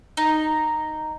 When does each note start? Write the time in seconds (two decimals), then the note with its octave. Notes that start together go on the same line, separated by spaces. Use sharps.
0.17 D#4